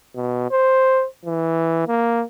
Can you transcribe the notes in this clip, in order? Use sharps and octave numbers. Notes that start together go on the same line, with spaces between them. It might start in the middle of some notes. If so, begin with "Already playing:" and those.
B2
C5
E3
A#3